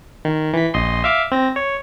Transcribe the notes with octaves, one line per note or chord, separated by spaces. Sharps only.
D#3
E3 B6
A#1 D#5 C6
E5 F5 D6
C4 A#6
C#5